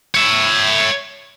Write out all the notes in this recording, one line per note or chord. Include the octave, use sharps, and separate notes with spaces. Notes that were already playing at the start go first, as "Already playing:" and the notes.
C#5 E5